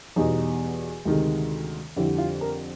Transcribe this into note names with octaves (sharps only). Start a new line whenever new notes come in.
E2 B2 G3 D#4
D2 C3 D#3 G#3
F2 D3 G3 E4
F4
A#4